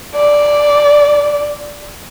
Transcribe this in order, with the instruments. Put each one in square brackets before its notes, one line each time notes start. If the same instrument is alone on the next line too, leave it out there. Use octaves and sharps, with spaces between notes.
[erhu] D5